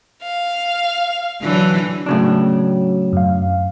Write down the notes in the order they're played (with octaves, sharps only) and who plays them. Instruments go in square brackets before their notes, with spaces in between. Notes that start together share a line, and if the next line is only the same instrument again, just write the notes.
[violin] F5
[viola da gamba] D3 E3 F#3
[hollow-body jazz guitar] A2 C#3 D4 [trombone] F#3
[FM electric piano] F#2 F5